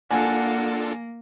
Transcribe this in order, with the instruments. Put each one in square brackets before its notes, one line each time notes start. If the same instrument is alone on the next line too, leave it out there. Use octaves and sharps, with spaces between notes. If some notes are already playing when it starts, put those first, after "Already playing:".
[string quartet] A#3 [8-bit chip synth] D4 F4 A4 [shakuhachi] F#5 [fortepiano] G#5